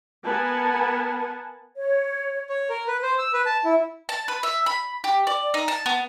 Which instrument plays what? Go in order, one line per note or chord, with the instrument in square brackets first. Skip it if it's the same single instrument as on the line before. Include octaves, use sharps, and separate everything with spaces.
[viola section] B3 A#4 B4 F#5 G#5 A5
[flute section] C#5
[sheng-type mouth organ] C#5
A#4
B4
C5
E6
B4
A5
E4
[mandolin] A5
B4
E5
B5
G4
D5
D#4
A5
B3